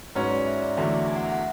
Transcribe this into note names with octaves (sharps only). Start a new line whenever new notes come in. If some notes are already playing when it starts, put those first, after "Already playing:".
G#2 F#3 C#4 B4
D5
E5
D5
E2 D3 F#3 A3 E5
G#5
F#5
E5
F#5